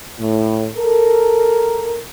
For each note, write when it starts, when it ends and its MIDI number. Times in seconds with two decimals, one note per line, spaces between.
0.19 0.67 45
0.76 2.00 69
0.76 2.00 70